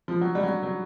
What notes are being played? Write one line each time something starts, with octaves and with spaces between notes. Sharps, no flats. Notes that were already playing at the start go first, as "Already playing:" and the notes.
F3
F#3
G3
F#3
G3
F#3